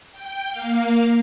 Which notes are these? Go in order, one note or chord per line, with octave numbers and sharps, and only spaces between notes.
G5
A#3 F5